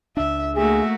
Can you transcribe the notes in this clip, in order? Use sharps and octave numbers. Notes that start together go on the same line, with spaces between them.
C#2 D4 E5
A3 A#3 F#4 G#4 E5